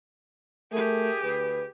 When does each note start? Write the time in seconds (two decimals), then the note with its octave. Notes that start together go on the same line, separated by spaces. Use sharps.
0.72 A3 G4 G#4 A#4
1.23 D2 B4